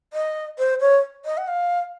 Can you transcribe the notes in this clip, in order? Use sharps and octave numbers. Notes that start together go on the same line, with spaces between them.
D#5
C5
C#5
D#5
F#5
F5